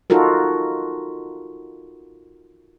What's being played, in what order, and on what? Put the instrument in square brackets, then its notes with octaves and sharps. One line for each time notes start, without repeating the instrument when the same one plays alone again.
[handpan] D#4 F4 F#4 A4 A#4